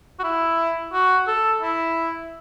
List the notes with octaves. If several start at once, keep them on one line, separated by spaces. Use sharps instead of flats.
F#4
E4
F#4
A4
E4